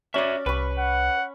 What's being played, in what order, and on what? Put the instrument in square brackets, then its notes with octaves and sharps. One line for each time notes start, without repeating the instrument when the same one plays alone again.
[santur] C#4 D5 [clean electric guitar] F#4 E5
[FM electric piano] C2 [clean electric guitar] B4 [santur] B5 C#6
[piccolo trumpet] F#5